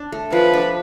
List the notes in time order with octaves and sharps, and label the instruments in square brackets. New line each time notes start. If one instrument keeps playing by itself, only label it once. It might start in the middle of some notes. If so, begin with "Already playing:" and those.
Already playing: [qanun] D4
A3
[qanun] F3 [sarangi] B4
[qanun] D4